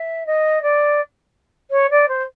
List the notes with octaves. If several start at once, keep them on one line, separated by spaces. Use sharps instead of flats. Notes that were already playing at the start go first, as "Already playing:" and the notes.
Already playing: E5
D#5
D5
C#5
D5
C5